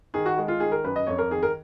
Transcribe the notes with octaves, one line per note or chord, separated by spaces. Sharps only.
D#3 G#4
F#4
G#3
F4
D#3 G#4
A#4
F#2 B4
D#5
F2 C#5
A#4
D#3 G#4
A#4